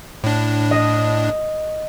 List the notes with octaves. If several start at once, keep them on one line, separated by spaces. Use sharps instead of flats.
A2 D4
D#5